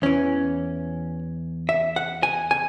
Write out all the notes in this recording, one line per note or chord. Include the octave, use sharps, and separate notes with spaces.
E2 E3 C#4
E5
F#5
G#5
G#5